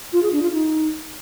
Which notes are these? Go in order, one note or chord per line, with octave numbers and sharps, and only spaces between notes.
F4
G#4
D4
F4
D#4